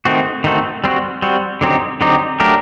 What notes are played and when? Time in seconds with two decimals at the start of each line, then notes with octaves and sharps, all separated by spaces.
0.05 D#3 A3 C4 F#4
0.44 D#3 A3 C4 F#4
0.84 G3 C4 F#4
1.22 G3 C4 F#4
1.61 D3 F#3 C4 D#4 G4
2.01 D3 F#3 C4 D#4 G4
2.40 F#3 A3 D4 G4 A#4